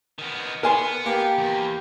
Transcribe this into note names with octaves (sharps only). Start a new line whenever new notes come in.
D#3 B3
B3 A#4 G#5 C6
A#3 G4
E2